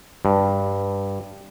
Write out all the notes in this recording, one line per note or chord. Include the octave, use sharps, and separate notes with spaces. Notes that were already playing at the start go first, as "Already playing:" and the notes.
G2